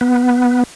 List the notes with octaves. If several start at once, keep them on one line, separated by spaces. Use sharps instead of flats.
B3